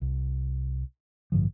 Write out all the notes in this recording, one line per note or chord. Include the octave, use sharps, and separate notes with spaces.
C2
A1 G2 D3 F3